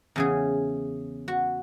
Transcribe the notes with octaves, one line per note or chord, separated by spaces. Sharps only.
E2 C#3 G#4
F#4